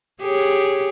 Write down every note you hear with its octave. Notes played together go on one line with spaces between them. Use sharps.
G4 G#4 C#5